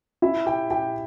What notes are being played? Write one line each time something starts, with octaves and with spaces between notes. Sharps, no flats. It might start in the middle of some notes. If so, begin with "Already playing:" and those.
E4 E5
G4 G5
G4 G5